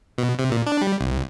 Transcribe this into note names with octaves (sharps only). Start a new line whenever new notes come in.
B2
C3
A#2
D4
G3
C2